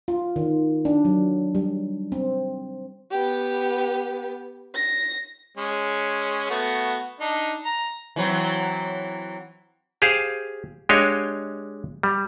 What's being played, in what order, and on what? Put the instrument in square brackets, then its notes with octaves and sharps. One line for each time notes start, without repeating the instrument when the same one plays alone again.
[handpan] F4
D#3
D4
F#3
G3
C4
[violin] B3 G4
A#6
[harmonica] G#3 C#4
A3 B3 F#4
D4 D#4
A#5
[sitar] E3 F#3 C4
[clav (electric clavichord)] G4 G#4 C5 F5
G#3 D4 G4 C#5 D#5 F5
G3